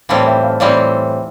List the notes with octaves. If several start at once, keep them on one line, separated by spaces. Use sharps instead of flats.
A2 E3 G3 C4 F5 A5
E5 G5
F5 A5
A2 E3 G3 C4 D5 F5